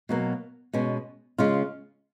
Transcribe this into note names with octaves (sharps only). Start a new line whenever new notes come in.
B2 F#3 A#3
B2 G#3 C#4
C#3 G#3 C#4 F4